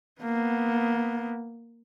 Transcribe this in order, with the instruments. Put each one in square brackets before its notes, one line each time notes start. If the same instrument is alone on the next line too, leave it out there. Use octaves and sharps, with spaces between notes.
[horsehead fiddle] A#3 B3